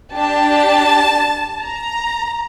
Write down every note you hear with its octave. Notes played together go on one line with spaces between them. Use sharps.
D4 G4 A5
A#5